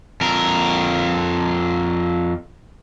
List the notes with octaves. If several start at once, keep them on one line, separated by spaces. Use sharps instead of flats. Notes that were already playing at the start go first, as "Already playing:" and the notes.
F2 A#4